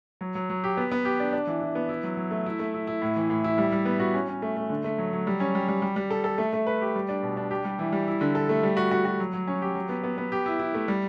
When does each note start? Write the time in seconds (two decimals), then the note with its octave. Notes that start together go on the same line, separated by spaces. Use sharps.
0.21 F#3
0.35 F#3
0.50 F#3
0.64 G4
0.77 B3
0.92 B3
1.05 G4
1.20 D4
1.33 D4
1.47 E3
1.61 E3
1.75 B3
1.89 E4
2.03 F#3
2.17 F#3
2.31 A3
2.46 E4
2.59 A3
2.74 E4
2.87 E4
3.02 A2
3.16 E3
3.30 A2
3.44 E4
3.58 G3
3.72 G3
3.85 B3
4.00 F#4
4.14 C#4
4.28 C#4
4.42 A3
4.56 A3
4.70 D3
4.84 A3
4.98 F#3
5.13 F#3
5.27 G3
5.40 C#4
5.55 G3
5.68 G3
5.82 G3
5.96 G3
6.10 A4
6.24 A4
6.38 A3
6.53 A3
6.67 B4
6.81 G4
6.95 G3
7.09 D4
7.23 B2
7.37 D4
7.51 G4
7.65 G3
7.79 E3
7.92 G3
8.08 E4
8.21 D3
8.35 A4
8.49 A3
8.63 G3
8.77 F#4
8.91 F#4
9.05 F#4
9.19 F#3
9.33 F#3
9.47 C#4
9.62 G4
9.75 F#3
9.89 B3
10.04 B3
10.18 B3
10.32 G4
10.46 E4
10.59 E4
10.74 A3
10.88 G3